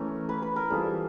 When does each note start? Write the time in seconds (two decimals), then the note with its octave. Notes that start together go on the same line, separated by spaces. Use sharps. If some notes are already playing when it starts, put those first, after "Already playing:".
Already playing: E3 A3 C#4 A#4
0.29 B4
0.42 B4
0.56 A#4
0.70 E3 G3 C4 F4 G#4 A4